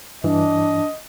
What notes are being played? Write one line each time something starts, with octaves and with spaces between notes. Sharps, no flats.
G2 E3 D4 D#5